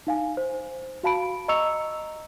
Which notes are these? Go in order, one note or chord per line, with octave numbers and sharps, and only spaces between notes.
D#4 F5 G#5
C5
F#4 F5 A5 B5 D7
D#5 A#5 C#6 E6 C#7 F7